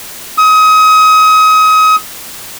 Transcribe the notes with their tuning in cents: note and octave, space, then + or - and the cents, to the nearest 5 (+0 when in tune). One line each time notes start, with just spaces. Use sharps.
D#6 +30